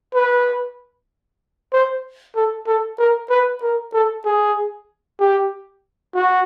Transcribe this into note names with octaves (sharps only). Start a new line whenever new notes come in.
B4
C5
A4
A4
A#4
B4
A#4
A4
G#4
G4
F#4